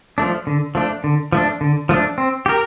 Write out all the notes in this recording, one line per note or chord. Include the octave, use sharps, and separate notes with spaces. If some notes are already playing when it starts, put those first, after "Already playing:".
F3 A3 D4
D3
F3 A3 D4
D3
F3 A3 D4
D3
F3 A3 D4
C4
G4 A#4